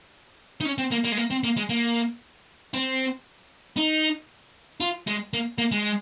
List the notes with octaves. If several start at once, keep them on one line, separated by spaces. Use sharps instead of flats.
D#4
C#4
C4
A#3
A#3
G#3
A#3
C4
A#3
G#3
A#3
C4
D#4
F4
G#3
A#3
A#3
G#3